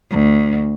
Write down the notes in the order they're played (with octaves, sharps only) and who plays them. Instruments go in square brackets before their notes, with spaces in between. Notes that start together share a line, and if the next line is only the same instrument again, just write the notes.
[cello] D2